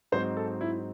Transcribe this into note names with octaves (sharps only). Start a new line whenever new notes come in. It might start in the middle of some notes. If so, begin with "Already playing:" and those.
G#2 F#3 C4 D#4 C5
A4
E4